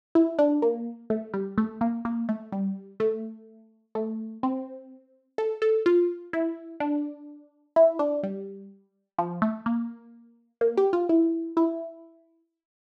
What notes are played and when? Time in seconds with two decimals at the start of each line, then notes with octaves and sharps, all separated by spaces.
0.15 E4
0.39 D4
0.62 A#3
1.10 A3
1.34 G3
1.58 A3
1.81 A#3
2.05 A#3
2.29 A3
2.52 G3
3.00 A3
3.95 A3
4.43 C4
5.38 A4
5.62 A4
5.86 F4
6.33 E4
6.80 D4
7.76 E4
7.99 D4
8.23 G3
9.18 F3
9.42 A3
9.66 A#3
10.61 A#3
10.77 G4
10.93 F4
11.09 E4
11.57 E4